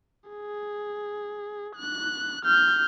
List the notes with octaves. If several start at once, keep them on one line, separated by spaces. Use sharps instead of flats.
G#4
F#6
F6 G6